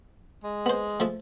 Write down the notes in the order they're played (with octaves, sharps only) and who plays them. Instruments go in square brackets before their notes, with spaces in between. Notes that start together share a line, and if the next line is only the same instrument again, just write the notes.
[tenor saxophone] G#3
[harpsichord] B3 C5
F3 A3